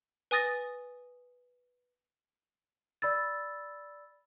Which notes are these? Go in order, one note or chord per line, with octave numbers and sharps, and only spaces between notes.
B4 G#5 D#6 A6 A#6
D5 B5 E6 A6